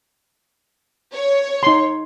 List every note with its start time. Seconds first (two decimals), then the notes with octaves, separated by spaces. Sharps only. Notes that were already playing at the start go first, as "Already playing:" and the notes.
1.13 C#5
1.63 D#4 C6